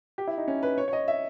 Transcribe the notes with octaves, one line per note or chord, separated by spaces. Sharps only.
G4
E4
D#4
C#4
B4
C#5
C#5
D#5
E5